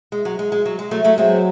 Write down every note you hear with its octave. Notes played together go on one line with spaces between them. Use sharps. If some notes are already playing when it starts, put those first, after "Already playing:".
G#3
F#3
G#3
G#3
F#3
G#3
F#3 A3
F#3 A3
F#3 G#3 C4